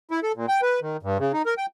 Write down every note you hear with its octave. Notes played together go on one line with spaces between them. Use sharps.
E4
A4
A#2
G5
B4
D#3
G2
C#3
D#4
A#4
G5